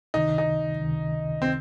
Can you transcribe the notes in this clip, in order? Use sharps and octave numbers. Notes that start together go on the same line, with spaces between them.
C#2 C3 D#3 D#4
D#4
C#2 C3 D#3
C4